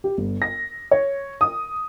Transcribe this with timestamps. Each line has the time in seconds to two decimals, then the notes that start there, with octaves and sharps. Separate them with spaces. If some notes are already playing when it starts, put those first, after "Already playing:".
0.04 G4
0.18 G1
0.42 A#6
0.91 C#5
1.41 D#6